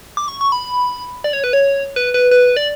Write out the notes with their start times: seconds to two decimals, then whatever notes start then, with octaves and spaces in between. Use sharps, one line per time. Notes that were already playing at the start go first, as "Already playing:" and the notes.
0.17 D6
0.28 C#6
0.41 C#6
0.52 B5
1.24 D5
1.33 C#5
1.44 B4
1.53 C#5
1.96 B4
2.14 B4
2.31 B4
2.57 D5